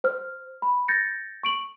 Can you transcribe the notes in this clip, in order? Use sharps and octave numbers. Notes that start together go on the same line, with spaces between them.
C5 F6
B5
G6 A6 A#6 C#7
C#6 D7 F#7